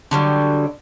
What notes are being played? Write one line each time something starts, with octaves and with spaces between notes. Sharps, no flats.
D3 F#3 G3